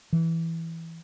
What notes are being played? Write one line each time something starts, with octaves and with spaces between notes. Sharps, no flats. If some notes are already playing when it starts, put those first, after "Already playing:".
E3